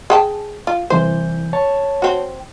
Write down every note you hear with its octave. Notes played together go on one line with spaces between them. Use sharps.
G#4 G5 A5
F4
C2 E3 C5 G6
C#5 A5
C4 F#4